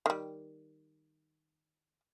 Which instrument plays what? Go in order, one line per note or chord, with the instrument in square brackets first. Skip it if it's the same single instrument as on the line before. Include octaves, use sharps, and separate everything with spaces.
[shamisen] D#3 G3